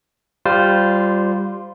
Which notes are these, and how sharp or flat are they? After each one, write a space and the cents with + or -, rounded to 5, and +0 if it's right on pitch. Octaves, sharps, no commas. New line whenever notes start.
G3 +0 F4 +5 C5 -15